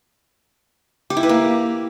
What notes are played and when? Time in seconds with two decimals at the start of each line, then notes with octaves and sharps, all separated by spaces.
1.10 G4
1.17 E4
1.23 B4
1.29 A#3